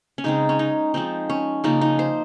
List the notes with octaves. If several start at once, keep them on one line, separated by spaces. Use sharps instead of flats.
C#4
C#3 G#3 C4 D#4
C#4
D#4
F3 G#3 C4 D#4
C#4
C#3 F3 A#3 D#4
D#4
C5